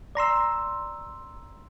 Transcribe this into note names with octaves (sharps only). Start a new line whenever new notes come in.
D5 A#5 C6 E6